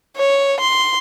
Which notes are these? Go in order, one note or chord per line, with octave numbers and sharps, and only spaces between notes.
C#5
C6